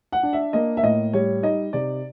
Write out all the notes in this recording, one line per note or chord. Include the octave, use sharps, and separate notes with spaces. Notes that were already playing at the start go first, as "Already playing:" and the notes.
F#5
D4
E5
A#3 D#5
E5
A2 D#5
G3 C#5
D#4 D#5
C3 D5